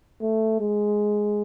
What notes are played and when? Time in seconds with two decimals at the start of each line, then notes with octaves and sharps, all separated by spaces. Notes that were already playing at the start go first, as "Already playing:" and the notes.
0.22 A3
0.61 G#3